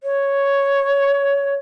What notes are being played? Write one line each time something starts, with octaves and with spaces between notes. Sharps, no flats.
C#5